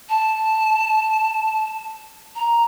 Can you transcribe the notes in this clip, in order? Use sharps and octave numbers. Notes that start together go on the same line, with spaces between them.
A5
A#5